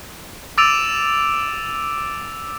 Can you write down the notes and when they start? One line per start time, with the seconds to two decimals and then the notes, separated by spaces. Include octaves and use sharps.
0.58 D6 E6 A6 D7 D#7 F7